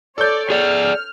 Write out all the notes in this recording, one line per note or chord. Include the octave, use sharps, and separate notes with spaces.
A4 C#5 D5 G6
G#4 D5 F6